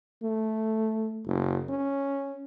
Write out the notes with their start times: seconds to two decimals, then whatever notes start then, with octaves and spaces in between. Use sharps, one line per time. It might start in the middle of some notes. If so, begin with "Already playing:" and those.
0.23 A3
1.26 F#1
1.70 C#4